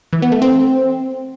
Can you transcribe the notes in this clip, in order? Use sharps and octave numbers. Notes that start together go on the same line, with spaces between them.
E3
B3
A3
C4